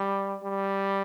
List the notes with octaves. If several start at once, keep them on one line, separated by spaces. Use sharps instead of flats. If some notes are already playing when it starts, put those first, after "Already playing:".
Already playing: G3
G3